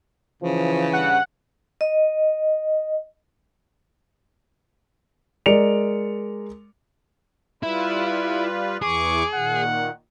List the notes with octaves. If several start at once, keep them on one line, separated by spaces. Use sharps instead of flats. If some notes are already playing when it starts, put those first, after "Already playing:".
C#3 E3 F3
G2 F#5
D#5
G#3 A#4 D5 C#7 D7 F7
G3 E4 F4 B4
E2 E3 G#4 C#6 D6
A#2 D#3 F#5